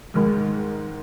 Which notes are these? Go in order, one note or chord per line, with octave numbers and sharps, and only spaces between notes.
G#2 D#3 G#3